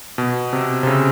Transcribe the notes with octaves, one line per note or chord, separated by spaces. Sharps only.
B2
C3
C3
C#3